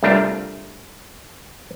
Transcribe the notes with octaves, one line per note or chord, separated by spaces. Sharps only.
C2 G3 A3 D4 F4 A#4